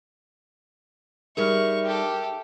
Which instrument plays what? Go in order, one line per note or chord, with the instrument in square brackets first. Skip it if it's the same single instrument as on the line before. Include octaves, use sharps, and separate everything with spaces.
[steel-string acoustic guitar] G3 D#4 G#4 [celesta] A#4 F6 [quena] E5 [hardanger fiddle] C#6
[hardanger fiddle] G4 A4